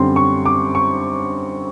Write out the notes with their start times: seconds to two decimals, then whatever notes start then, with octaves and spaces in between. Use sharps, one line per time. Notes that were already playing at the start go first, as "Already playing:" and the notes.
Already playing: F#2 D3 G3 C4 C6
0.16 C#6
0.45 D6
0.75 C#6